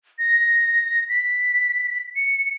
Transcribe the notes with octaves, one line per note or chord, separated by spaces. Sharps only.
A#6
B6
C#7